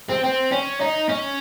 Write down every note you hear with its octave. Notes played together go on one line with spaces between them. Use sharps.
C4
C4
C#4
D#4
C#4